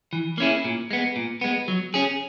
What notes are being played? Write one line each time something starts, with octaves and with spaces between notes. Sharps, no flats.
E3
A#3 C#4 E4 G#4
A#2
G#3 B3
A#2
G#3 B3
F#3
C#4 G#4